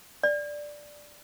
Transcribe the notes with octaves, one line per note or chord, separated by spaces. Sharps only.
D5